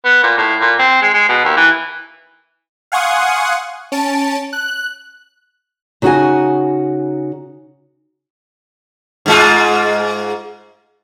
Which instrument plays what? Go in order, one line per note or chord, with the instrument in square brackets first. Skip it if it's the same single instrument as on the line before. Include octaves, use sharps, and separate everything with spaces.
[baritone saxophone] B3
A#2
A2
A#2
C4
G#3
G#3
B2
D#2
E3
[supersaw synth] F5 F#5 G#5 C6 C#6 D#6
C#4 A5 D7
F#6
[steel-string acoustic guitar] C#3 D#4 F#4 C#5 F#5 G#5
[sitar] G#2 G#3 F4